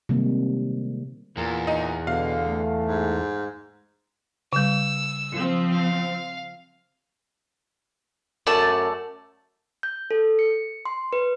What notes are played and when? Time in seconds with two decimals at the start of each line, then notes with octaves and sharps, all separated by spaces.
0.09 C3 D#3 G3 G#3 A#3
1.37 E2 A#2
1.67 D#4
2.07 B2 D3 F5
2.47 A3
2.86 G#2
4.53 C#3 G3 E6
5.33 F3 C4
5.72 F5
8.47 F#2 A3 D5 A5
9.83 G6
10.11 A4
10.39 C#7
10.85 C6
11.13 B4